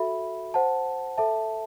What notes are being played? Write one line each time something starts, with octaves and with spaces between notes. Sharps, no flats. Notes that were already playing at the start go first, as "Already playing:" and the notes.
Already playing: F#4 A4 E5 B5
C5 F#5 A5
A4 E5 A5